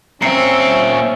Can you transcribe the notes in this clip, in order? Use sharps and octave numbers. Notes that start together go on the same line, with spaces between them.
A#2 C4 C#4 E5 A#5 C7 C#7